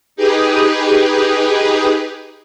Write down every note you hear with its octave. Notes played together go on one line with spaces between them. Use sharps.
D#4 G4 G#4 B4